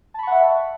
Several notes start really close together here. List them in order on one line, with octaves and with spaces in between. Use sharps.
A5 B5 C#6 F#5 E5